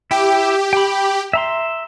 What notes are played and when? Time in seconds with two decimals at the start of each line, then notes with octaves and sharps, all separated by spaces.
0.11 E4 G4 G5
0.73 G5 B5
1.33 E5 A#5 C6